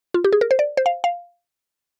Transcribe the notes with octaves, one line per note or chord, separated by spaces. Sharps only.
F4
G4
G#4
A#4
C5
D5
C5
F5
F5